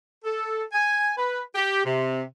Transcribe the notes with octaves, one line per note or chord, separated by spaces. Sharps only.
A4
G#5
B4
G4
C3